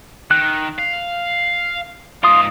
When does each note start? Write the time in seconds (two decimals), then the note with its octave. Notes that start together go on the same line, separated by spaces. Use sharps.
0.31 D#3 F#6
0.79 F5
2.23 G#2 F4 F5 C6 D#6